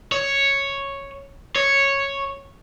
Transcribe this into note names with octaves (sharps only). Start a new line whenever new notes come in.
C#5
C#5